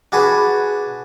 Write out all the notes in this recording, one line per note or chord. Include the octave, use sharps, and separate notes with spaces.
D4 F#4 G#4 B4